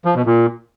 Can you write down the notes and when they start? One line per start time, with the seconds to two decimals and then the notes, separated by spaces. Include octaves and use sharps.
0.05 F3
0.15 B2
0.26 A#2